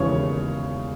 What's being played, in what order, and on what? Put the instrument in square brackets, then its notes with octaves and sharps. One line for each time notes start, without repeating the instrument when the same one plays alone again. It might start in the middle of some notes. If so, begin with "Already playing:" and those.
Already playing: [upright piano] E1 D#2 C#3 E3 C#5